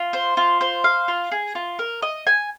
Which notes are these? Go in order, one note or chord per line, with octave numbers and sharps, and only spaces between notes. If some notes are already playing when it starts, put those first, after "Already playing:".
Already playing: F4
C5
F4
C5
F5
F4
G#4
F4
A#4
D#5
G#5